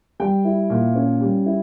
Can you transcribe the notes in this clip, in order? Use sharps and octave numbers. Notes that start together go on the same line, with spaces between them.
G3 G5
E4
A#2
C#4
G3
E4